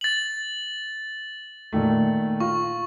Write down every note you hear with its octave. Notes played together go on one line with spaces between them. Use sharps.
A6 F#7
A#2 D#3 A3
F4 C#6